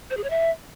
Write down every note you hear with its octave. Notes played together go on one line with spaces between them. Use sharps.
C5
G#4
C#5
E5